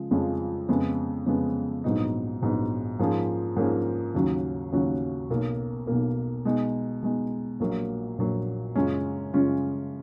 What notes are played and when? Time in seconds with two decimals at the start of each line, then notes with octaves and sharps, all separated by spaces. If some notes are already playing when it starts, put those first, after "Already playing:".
Already playing: C#3 F3 G#3
0.11 F2 C#3 F3 G#3 C#4
0.69 F2 C#3 G#3 B3
1.26 F2 C#3 G#3 B3
1.84 A#1 G#2 F#3 B3 D#4
2.42 A#1 G#2 F#3 B3 D#4
2.99 G#2 F3 A#3 C#4 G#4
3.56 G#2 F3 A#3 C#4 G#4
4.14 D#2 C#3 F#3 C#4 F#4
4.72 D#2 C#3 F#3 C#4 F#4
5.30 B1 B2 A#3
5.87 B1 B2 A#3
6.45 B2 G#3 D#4
7.02 B2 G#3 D#4
7.60 A#1 A#2 F#3 A#3
8.18 A#1 A#2 F#3 A#3
8.75 F#2 C#3 G#3 C#4 F4
9.33 F#2 C#3 G#3 C#4 F4